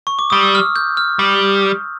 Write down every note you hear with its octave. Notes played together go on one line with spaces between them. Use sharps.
C#6
D6
G3 D#6
E6
F6
G6
F6
G3